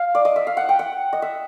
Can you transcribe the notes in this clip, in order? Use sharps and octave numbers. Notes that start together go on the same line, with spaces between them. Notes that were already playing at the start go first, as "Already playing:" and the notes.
Already playing: F5
D5
D#5
E5
F5
F#5
G5
F#5
D#5
E5